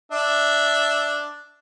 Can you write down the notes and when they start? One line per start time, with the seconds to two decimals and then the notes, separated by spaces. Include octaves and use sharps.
0.12 D4 E5